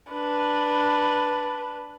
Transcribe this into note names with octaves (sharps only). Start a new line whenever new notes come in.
D4 B4